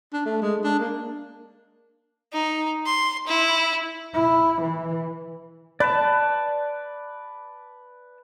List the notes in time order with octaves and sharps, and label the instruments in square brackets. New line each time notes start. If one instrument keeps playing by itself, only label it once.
[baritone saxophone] D4
A3
G#3
D4
A#3
[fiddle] D#4
C6
E4
[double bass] E4
E3
[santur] B4 [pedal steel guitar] D5 A5